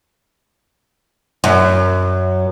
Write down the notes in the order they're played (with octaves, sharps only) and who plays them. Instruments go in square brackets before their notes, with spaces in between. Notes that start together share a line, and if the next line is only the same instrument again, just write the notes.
[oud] F#2